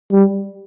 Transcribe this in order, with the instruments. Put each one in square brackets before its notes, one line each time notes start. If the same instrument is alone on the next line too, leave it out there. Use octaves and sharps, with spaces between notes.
[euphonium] G3